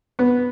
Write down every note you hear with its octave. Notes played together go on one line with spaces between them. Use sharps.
B3